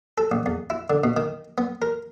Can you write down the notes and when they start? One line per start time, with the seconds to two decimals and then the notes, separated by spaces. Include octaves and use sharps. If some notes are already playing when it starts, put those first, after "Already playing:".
0.18 A4
0.32 A1
0.46 E2
0.70 E4
0.90 D3
1.04 B2
1.17 D#3
1.58 B3
1.82 A#4